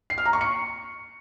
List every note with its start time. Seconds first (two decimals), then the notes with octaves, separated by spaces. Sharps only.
0.10 C7
0.18 F6
0.25 A#5
0.33 C#6
0.41 C#7